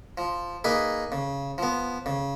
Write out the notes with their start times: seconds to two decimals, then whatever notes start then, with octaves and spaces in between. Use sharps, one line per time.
0.18 F3
0.64 A#3 D#4 G#4 B4
1.12 C#3
1.58 F3 B3
2.06 C#3